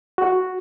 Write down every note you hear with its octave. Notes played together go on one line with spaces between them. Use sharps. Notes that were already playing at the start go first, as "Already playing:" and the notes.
F#4